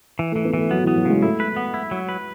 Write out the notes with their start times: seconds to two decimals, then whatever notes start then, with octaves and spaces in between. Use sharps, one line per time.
0.19 E3
0.32 E3 A3
0.45 B3
0.54 E3 A3
0.71 F#3 B3
0.83 E3 B3
0.96 F#3
1.05 C#3 G#3
1.22 A3 E4
1.40 B4
1.57 B3
1.74 E4
1.91 F#3
2.09 B4